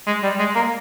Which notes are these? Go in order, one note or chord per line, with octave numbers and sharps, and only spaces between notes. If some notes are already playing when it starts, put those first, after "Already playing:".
G#3
G3
G#3
A#3